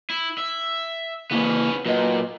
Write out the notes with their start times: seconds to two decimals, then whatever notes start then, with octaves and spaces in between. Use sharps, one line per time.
0.10 E4
0.38 E5
1.31 C#3 E3 A#3 B3 C#4
1.86 A#2 F#3 B4 D#5